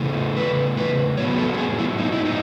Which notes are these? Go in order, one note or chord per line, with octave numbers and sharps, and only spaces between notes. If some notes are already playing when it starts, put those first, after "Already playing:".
Already playing: C#3 E3 A3
B4
B4
A2 F#3 B3 C#5
A4
A4
G#4
E4
D#4
E4
D#4